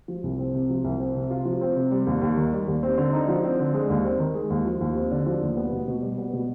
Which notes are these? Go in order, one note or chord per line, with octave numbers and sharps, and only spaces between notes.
F3
C2
C4
C3
F3
C2
C4
C3
F4
F3
C4
C3
G3
D#2
D#2
D#3
G3
D#2
C4
D3
D#4
F3
C4
D3
G#3
D#2
C4
D#3
G#3
D#2
F3
D#2
C4
D3
F3
D#2
B3
B2
B2
G3
B3
B2